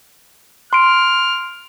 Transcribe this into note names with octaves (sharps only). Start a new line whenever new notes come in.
C6 F6 D7